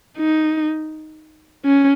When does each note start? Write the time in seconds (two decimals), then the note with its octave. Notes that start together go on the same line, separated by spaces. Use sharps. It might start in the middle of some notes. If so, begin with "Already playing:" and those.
0.18 D#4
1.65 C#4